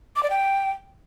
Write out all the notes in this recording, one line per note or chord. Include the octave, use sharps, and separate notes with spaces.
D6
D5
G5